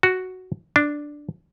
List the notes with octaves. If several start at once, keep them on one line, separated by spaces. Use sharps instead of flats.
F#4
D4